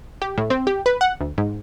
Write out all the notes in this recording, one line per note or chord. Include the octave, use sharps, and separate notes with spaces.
G4
A2
C4
G4
B4
F#5
D2
G#2